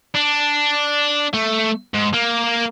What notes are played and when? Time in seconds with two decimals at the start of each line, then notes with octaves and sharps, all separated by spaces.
0.14 D4
1.34 A3
1.94 G#2
2.14 A#3